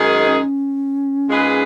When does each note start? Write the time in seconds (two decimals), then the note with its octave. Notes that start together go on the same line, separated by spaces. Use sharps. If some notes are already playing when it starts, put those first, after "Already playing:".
Already playing: F#2 D#3 G#3 D#4 G#4
0.24 C#4
1.28 A#2 G#3 D#4 G#4 B4